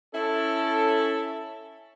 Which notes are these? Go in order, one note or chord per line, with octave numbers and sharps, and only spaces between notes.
C#4 E4 A4